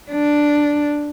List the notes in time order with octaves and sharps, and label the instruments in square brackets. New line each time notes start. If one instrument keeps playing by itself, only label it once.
[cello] D4